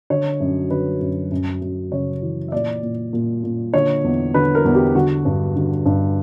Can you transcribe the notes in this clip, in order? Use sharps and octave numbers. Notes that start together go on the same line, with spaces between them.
D3 C#5
F#2
D3 B4
F#2
F#2
F#2
C#3 C#5
E3
E5
A#2 D5
A#2
A#2
A#2
D3 C#5
E2
D3 B4
A#4
E2
G4
D3 F#4
G2
D3
G2